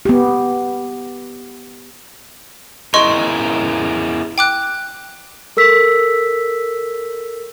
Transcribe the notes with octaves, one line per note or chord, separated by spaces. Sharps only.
B3 G4
E4 G#4 A#4 D#5 C6 C#6
G5 D6 F#6
A4 A#4 E6 B6